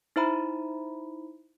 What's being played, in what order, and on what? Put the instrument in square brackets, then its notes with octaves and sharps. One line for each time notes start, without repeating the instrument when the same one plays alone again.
[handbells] D#4 E4 C5 E5 A#5 B5